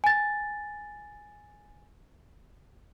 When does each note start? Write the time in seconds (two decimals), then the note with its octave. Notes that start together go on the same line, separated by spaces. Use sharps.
0.04 G#5 A6